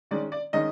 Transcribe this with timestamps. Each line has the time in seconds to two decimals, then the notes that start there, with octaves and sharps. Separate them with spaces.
0.11 D#3 G#3 C#4 D5
0.32 D5
0.53 D#3 G#3 C#4 D#5